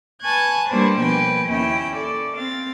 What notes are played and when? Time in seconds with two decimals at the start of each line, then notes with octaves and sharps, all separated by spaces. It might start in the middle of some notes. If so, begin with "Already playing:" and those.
0.22 B4 G#5 A5 C#6 F#6 G#6
0.68 G3 A#3 D4 B4 C5
1.00 B2 F3 A#3 B4 G5 G#5
1.47 D#2 C#4 E4 G5
1.95 A4 D5
2.37 C4 F5 A6